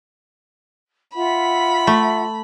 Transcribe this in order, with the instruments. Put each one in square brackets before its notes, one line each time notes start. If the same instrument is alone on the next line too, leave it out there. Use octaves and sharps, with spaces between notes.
[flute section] F4 E5 F#5 [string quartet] B5
[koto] A3